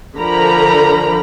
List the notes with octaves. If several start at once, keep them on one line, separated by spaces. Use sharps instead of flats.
D3 F3 A#4 A#5 B5